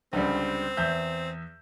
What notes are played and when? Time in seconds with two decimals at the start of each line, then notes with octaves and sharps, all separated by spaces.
0.13 C#2 D3 G3 C4
0.77 E2 E5 G6